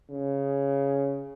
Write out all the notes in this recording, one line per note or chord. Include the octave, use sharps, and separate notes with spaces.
C#3